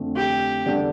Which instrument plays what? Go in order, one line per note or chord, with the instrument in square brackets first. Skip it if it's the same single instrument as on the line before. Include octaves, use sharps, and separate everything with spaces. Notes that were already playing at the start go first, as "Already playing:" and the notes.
Already playing: [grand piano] F2 D3 A3
[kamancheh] G4
[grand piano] E2 D3 G3 D4 A4